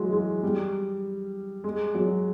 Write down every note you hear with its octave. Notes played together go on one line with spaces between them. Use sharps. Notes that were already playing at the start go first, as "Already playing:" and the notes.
Already playing: E3 F#3 G#3
G#3
G3
G#3
F#3